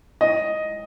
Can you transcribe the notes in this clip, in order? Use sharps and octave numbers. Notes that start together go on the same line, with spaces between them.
D#5